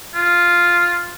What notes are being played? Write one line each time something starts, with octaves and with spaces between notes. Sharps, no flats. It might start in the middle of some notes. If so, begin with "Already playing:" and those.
F4